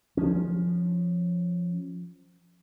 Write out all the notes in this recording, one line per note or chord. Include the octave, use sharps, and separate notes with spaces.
F3 C#4